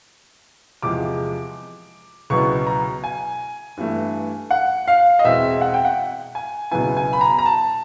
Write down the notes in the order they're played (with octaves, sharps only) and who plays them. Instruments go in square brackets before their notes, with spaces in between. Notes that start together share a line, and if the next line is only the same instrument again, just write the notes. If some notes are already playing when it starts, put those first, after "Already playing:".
[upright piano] E2 C3 F3 G#3 D6
C#2 B2 F#3 B3 E4 C#6
A#5
G#5
G2 E3 A3
F#5
F5
D#5
E2 B2 G#3 C4 E5
F#5
G5
F#5
G#5
C#2 B2 F#3 B3 E4 G#5
G#5
B5
A#5
A#5
A5